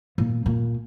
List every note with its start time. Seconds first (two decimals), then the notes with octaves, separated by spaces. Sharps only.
0.18 A#2
0.46 A#2